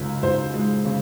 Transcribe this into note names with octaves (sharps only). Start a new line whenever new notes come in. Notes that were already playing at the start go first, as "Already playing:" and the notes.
Already playing: C#2 C#3
C#2 C5
G#3
C#3